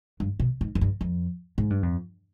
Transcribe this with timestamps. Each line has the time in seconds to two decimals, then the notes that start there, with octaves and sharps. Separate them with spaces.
0.20 G2
0.40 B2
0.61 G#2
0.75 F2
0.81 G2
1.01 F2
1.58 G#2
1.70 G2
1.83 F2